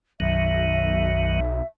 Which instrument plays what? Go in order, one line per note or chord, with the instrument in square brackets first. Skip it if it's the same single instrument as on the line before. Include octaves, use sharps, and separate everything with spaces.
[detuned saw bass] B1 [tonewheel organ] F#2 D#3 F#3 [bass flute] E5